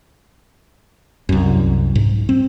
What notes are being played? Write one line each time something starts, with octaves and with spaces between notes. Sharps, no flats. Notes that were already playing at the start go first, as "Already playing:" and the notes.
C2 F#2
G#2
C4